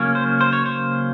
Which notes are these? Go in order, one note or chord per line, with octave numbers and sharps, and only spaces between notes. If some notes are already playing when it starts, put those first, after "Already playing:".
Already playing: C#3 F#3 A#3 C#4
C5
C5
C#5
C5